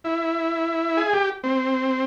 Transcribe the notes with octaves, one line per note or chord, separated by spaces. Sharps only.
E4
G#4
G4
C4